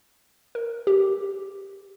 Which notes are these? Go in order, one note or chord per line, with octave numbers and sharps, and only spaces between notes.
A#4
G4